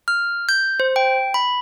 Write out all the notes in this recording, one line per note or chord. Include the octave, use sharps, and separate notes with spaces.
F6
G6
C5
G5
B5